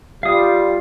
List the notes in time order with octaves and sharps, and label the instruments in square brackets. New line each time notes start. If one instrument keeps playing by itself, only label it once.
[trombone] G3 [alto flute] F4 [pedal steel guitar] F5 D#6